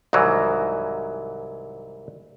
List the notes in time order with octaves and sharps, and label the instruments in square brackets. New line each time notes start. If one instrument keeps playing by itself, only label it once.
[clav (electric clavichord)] C2 G#2 D#3 E3 F#3